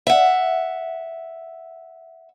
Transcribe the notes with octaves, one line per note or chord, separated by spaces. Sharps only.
E5 F#5